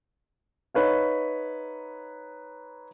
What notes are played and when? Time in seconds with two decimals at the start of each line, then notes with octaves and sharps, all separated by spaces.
0.74 D#4 B4 C#5 F5